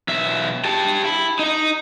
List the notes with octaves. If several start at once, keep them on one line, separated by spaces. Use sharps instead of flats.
B1 E5
G4 A5
E4
D#4 D#5